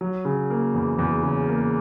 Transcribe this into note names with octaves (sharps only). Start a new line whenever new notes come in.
F#3
C#3
A#3
E2
E2
C#3
A#3